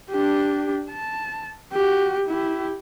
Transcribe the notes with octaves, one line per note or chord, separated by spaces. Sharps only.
D4 G4
A5
F#4 G4
E4 G4